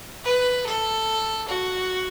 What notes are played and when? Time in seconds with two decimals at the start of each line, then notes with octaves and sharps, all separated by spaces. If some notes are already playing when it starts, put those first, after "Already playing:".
0.24 B4
0.66 A4
1.48 F#4